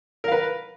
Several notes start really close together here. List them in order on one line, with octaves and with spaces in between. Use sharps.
A#4 F5 B4